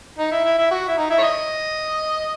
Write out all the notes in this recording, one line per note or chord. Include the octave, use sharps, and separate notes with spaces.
D#4
E4
E4
E4
F#4
E4
D#4
E4
C#5
D#5